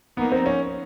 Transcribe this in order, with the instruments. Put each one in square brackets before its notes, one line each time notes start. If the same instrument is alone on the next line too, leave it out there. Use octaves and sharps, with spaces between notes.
[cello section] F3 A#3 D#4 [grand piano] B3
[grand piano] C4
C#4